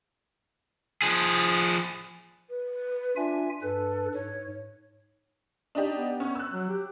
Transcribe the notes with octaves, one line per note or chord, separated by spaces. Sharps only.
F3 G#4
B4
D4 F4 E5 G#5
G2 A4 B4
G#2 C#5
D4 D#4 G4
B3
C#4
E6 F#6
F#3
G4